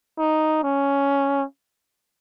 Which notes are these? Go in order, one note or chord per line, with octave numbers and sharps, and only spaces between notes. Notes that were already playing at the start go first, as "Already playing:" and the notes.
D#4
C#4